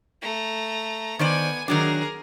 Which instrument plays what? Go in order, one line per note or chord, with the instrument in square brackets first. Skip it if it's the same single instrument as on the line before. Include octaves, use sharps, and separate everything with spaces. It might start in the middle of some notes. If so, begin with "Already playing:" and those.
[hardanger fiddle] A3 A#5
[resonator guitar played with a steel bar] D#3 C5 D5 [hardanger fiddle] B3 G#5
[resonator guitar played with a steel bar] D#3 F#3 D4 [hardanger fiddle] G#4 A#4